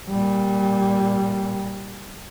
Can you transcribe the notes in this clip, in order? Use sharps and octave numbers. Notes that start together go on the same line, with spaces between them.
A#2 G3